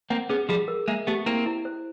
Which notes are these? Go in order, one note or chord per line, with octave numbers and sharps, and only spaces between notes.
A#3 C4 F#5
B3 C#4 G#4
F3 G3 G#4
A#4
G#3 A#3 E5
A3 B3 G4
A#3 C4 E4
E4
C5